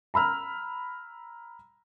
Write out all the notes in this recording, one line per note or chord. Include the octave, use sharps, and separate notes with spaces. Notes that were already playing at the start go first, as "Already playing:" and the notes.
A#5 B5 E6 F6